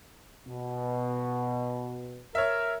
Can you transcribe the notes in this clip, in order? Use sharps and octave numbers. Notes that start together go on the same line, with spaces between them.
B2
A#4 C#5 E5